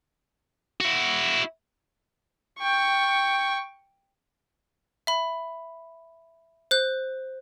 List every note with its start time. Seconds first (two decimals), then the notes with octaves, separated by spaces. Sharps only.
0.81 E4 F#4
2.59 G5 C#6
5.07 E5 B5
6.71 C5 F#6